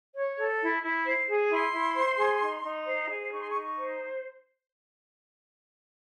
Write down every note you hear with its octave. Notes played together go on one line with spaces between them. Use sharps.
C#5
A4
E4
E4
C5
G#4
E4 C6
E4
C5
G#4
D#4
D#4
C5
G#4
D#4 C#6
C6
C#6
D#4
C#6
C5